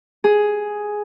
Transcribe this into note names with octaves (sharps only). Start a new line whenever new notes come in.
G#4